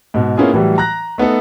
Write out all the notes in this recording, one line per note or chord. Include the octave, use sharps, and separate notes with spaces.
G#2 B2
A#3 B3 C#4 E4 F4 G#4
A2 E3 F#3 G3
A#5 F#6 A#6
A3 B3 D#4 A4